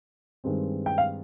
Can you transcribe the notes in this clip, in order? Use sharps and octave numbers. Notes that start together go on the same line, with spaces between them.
G2 D#3 G#3 C4
G5
F5